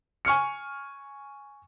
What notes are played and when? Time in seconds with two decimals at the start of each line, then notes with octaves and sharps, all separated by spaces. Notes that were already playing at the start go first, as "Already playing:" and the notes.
0.25 G#5 C#6 F6 C#7